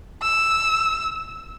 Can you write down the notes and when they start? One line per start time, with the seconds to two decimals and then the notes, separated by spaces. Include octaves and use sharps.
0.22 E6